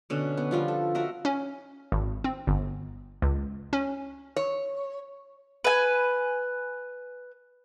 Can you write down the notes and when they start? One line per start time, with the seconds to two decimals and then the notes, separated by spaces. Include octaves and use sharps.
0.10 B2 D3 C#4
0.37 B3
0.51 F3 G3 F4
0.68 A4
0.95 F#4 A#4 D#5 E5
1.25 C#4
1.92 G#1
2.24 C4
2.47 G1
3.22 C#2
3.73 C#4
4.36 C#5
5.64 B4 G#5